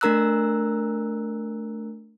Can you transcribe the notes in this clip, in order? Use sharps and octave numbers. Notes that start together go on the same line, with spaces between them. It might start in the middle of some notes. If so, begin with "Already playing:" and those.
A3 D4 A#4 A#5 E6 F#6